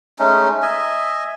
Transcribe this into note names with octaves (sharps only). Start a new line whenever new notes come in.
G#3 A3 C#4 D#4
D#5 E5 G#5